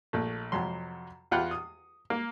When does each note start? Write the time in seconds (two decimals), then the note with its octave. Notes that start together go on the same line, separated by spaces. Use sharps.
0.13 A#1 A3
0.52 F2 C3 F#3 C6
1.32 E2 F4 F#5 G5 B5 F#6
1.51 D#6
2.10 A#3